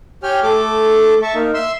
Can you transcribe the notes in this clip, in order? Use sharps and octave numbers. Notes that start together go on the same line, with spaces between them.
G4 C#5 G5 G#5 F6
A3 A4 D6
E5 A5 C#6
A#3 D#4
E5 C6 E6